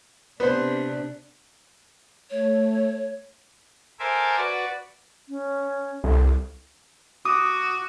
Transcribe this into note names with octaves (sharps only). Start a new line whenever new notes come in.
C3 B3 D4 C5
A3 C#5
A4 A#4 C5 E5 G#5 D6
F#4 B4 D5
C#4
C2 A4
F#4 D6 D#6